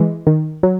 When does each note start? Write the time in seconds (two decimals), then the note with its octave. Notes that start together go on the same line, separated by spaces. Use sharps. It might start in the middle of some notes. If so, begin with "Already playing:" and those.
Already playing: E3 G#3
0.27 D#3
0.63 F#3